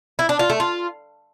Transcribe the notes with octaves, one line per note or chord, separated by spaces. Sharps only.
E4
D4
F4
A3
F4